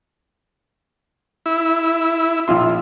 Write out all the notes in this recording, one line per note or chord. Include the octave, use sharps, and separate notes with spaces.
E4
A#1 F4 C6